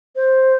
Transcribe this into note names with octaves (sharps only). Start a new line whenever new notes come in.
C5